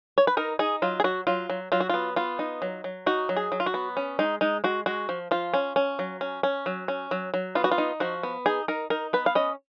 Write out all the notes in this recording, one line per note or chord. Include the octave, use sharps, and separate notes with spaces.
C#5
B4
D#4 A#4
D#4 G#4
F#3 F4
G#4
F#3 F#4
F#3 F4
F#3
F#3 F4
F#4
B3 F4
B3 F4
D#4
F#3
F#3
D#4 F#4
F#3
G#4
F#3
F4
F#4
B3
C#4
G#3 D#4
G#3 D#4
G#3 F#4
G#3 F#4
F3
F3 F4
C#4
C#4
F#3
C#4
C#4
F#3
C#4
F#3
F#3
B3 F4
F#4
F4
D#4
F3 F#4
B3
D#4 G#4
D#4 A#4
D#4 A#4
B3 B4
F5
C#4 D#5